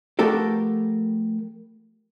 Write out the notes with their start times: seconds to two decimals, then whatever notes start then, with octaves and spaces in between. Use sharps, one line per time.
0.19 F3 A3 B3 G4 A4 A#4